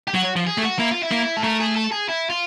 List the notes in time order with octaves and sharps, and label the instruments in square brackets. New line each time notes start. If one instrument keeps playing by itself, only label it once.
[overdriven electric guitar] G4
[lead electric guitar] F#3 [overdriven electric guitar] F#4
[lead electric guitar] F3
[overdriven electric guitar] G#4
[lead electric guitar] A3
[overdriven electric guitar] F#4
[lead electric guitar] A#3 [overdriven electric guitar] E4
[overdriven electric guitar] F4
E4
[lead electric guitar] A#3
[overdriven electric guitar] A4
[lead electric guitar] A3 [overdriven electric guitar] A#4
[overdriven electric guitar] G#4
A4
G#4
E4
F4